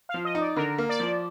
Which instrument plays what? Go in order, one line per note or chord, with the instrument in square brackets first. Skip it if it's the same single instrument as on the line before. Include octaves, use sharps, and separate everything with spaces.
[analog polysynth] F5
[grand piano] F3
[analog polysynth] D#5
[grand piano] D#4
[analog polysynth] D5
[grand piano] D3 [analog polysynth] A#4
[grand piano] A#3
[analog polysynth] D5
[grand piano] F3